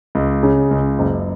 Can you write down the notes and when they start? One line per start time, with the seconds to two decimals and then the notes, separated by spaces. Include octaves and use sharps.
0.15 C#2
0.43 C#3
0.71 C#2
0.99 F#1